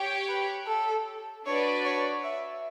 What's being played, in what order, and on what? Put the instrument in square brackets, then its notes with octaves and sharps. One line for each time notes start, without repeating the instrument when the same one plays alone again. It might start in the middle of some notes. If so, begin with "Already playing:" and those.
Already playing: [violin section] G4 C#5 G5
[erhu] B4
A4
[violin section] D4 F#4 B4 D5 [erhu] C#5
[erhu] C#5
E5